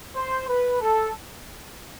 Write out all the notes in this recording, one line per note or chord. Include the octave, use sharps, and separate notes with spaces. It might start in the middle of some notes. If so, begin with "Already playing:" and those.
C5
B4
A4